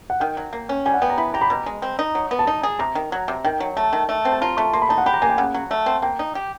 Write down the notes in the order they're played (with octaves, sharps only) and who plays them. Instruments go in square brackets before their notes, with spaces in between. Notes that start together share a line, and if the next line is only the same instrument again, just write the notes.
[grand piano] F#5
[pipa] D#3 [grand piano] G5
[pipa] F#3
A#3
C#4
[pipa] G3 [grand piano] G#5
[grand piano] F#5
[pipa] B3 [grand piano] G5
[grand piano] A#5
[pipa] E4 [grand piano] B5
[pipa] G4 [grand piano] A#5
[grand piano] B5
[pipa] B2 [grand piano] A#5
[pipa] G#3
C4
D#4
F#3
B3
[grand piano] A5
[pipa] D#4 [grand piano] A#5
[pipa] G#4
[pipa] C3 [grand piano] A#5
[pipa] D#3
F#3
C3
[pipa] D#3 [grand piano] G5
[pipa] F#3
[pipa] A3 [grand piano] A5
[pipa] D#3
A3
C4
[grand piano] A5
[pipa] F4 [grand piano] A#5
[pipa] A3 [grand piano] C#6
[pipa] A#3 [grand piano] C6
[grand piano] B5
[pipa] D#4 [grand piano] A5
[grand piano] F#5
[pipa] G4 [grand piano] B5
[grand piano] A#5
[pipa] A#3 [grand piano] G#5
[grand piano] G5
[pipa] C#3 [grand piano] F#5
[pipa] F#3
A3
C4
[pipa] A#3 [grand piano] G5
[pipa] D#4
G4